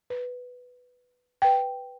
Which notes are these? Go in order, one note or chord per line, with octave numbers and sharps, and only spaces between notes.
B4
B4 G5